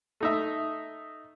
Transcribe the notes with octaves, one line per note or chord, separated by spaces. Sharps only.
A3 D#4 E5